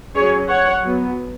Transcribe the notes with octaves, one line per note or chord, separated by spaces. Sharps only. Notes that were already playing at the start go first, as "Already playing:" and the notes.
F#3 C#4 G#4 C#5
C#5 F#5
F#3 B3